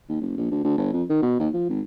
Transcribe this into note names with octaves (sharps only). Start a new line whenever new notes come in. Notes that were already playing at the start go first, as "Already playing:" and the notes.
D#2
F#1
A#1
D2
D2
G1
F2
D#3
B2
D#2
F3
G#1